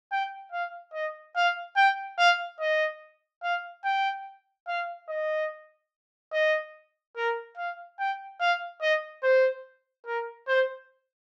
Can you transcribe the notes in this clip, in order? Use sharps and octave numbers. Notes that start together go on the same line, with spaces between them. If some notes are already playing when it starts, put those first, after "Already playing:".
G5
F5
D#5
F5
G5
F5
D#5
F5
G5
F5
D#5
D#5
A#4
F5
G5
F5
D#5
C5
A#4
C5